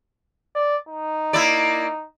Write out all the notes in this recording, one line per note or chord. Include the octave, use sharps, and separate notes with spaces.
D5
D#4
A#3 E4 D5